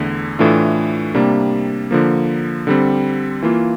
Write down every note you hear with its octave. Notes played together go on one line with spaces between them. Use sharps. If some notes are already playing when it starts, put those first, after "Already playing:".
Already playing: E2 D3 A3
A2 E3 A3 D4 F4
C3 G3 A#3 D4
D3 F3 A#3
D3 G3 C4
E3 A#3 F4